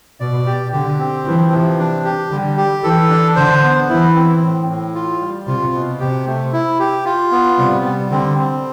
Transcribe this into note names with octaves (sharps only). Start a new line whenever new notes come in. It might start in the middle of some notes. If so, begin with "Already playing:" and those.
B2 D5
G4
D3 G4
C4
E3 F3
C3
D4
G4
D3 G3
G4
E3 A4
D4
D3 C5
B3
E3 E4
C4
A2
A2
F4
G3
C3 F4
B2
C3 G4
A3
E4
G4
F4
B3
C3 G3
G3
D3 C4
C4